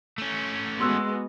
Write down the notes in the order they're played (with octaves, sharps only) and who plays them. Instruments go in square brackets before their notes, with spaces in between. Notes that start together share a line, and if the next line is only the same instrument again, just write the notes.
[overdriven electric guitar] A3 C#4
[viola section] G#3 B3 F#4 [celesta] C6 E6 F#6